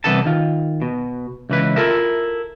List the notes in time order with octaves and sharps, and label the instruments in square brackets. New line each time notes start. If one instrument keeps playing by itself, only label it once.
[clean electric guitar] C2 C3 E3 B3 A4 A5
D#3 F4
B2
C#2 E3 B4
E4 F4 A4 A#4 E5